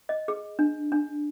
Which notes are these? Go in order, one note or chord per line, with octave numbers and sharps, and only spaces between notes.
D#5
G#4
D4
D4